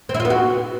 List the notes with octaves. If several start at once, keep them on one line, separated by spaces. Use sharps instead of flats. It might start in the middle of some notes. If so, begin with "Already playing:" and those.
C4
E4
F4
B3
F#4